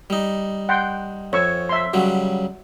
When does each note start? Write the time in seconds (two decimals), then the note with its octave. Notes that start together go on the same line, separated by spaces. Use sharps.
0.10 G3 D#4
0.69 F#5 G5 C6
1.33 F2 C#5 C#6 E6
1.69 E5 C6
1.93 C#3 F#3 G3 F#4